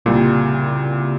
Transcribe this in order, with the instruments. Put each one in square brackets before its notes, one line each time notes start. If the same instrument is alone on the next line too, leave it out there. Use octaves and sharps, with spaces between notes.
[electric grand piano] C2 A#2 G3 [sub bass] C#3